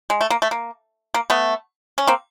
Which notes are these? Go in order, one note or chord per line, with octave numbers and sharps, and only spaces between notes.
G#3
A3
A#3
A3
A#3
A#3
A3 B3
C#4
A#3 C4